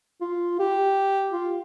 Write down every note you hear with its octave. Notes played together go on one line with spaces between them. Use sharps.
F4
G4
F4